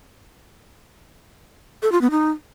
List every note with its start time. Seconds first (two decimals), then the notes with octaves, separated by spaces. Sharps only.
1.82 A4
1.92 F4
2.01 B3
2.11 D#4